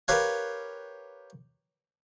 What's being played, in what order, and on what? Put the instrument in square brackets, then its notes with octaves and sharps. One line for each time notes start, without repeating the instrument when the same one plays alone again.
[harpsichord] G4 A#4 B4 C#5 F5 G#5